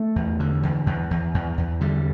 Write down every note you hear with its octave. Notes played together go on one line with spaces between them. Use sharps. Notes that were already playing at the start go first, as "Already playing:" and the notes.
Already playing: A3
E2
D3
E2
E2
E2
E2
E2
D3 G3